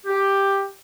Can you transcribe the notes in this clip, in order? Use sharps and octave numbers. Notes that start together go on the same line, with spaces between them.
G4